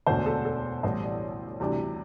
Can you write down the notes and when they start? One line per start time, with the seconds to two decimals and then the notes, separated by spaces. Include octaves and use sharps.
0.07 E1 D2 D3 C5
0.26 A4
0.45 A4
0.83 A1 G2 E3 G3 C5
1.02 D5
1.60 D2 C3 E3 G3 D4